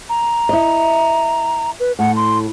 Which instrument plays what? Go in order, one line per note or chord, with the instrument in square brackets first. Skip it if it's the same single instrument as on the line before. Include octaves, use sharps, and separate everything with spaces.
[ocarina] A#5
[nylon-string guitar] E4 D#5
[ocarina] B4
[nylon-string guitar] A2 [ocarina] F#5
[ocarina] C6